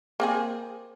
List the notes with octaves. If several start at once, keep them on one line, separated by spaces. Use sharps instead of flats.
A#3 C4 G#4